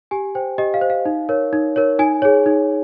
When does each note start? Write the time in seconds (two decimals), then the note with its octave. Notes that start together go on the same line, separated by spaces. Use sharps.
0.11 G4 G#5
0.35 C5 G5
0.58 G4 D#5
0.74 F5
0.81 C5
0.90 F5
1.05 D#4
1.29 A#4 C#5
1.53 D#4
1.76 A#4 C#5
1.99 D#4 G#5
2.22 G#4 C#5
2.46 D#4